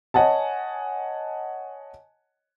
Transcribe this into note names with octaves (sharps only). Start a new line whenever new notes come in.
C#5 D#5 F#5 G#5 A5